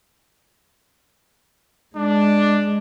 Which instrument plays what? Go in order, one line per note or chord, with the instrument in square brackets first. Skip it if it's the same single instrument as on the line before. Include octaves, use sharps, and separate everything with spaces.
[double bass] G#3 [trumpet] D4